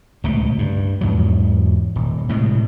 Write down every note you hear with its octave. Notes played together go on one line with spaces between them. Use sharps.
D1 C#2 B2 A3
G2
E2 G#2 F#3
D#1
A2 C3 G#3